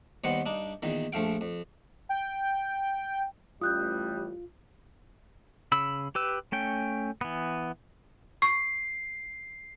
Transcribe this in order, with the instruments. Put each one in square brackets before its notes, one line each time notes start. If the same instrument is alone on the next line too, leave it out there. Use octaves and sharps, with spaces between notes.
[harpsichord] D#2 D#3 G3 B3 C5 F#5
G2 D4 D#4
E2 A#2 D#3
A#1 F3 A3 F5 G5
F2
[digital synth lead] G5
[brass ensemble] A1 A2 G3 [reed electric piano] F4 [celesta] D#6 F#6 G6
[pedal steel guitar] C#3 B5 E6
G4 B4 E6
A3 C#4 G5
E3 B3
[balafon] C#6 [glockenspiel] C7